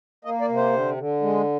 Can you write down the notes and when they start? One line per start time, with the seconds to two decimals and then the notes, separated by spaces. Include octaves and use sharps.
0.25 A#3 D#5
0.41 D5
0.49 C3
0.56 C5
0.72 D3
0.97 D3
1.21 G#3